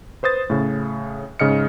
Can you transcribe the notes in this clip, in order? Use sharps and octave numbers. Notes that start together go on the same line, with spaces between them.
B4 C5 D#6 A6
A2 C#3
G#2 C#3 D#5 F6 C#7